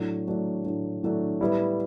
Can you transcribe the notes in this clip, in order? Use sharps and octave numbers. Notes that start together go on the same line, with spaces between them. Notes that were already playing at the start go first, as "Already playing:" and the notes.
Already playing: A2 F#3 A3 D4
A2 F#3 A3 D4
A2 F#3 A3 D4
A2 F#3 A3 D4
A2 G3 B3 E4